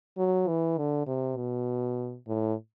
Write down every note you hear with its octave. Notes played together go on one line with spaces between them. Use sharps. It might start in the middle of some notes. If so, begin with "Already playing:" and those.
F#3
E3
D3
C3
B2
A2